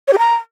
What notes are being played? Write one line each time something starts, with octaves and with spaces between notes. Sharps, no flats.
C#5
G4
A#5